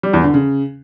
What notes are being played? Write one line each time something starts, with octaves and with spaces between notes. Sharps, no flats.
G3
E2
D3
C#3